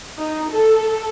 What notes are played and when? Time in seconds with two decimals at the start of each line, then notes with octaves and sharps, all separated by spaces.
0.18 D#4
0.50 A4